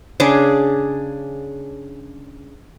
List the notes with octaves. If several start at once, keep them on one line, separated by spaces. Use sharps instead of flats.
C#3 D4 G#4